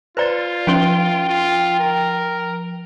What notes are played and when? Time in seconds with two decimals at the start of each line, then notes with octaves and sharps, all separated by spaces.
0.17 F4 B4 C5 D5 A#5 A6
0.67 F3 C#4 C5 G5 C6 D7 G7
1.29 F4
1.80 A#4